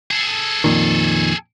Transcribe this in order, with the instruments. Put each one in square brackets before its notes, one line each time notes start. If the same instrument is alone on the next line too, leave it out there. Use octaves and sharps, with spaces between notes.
[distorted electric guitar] G#4 A4
[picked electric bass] F2 A#2 D#3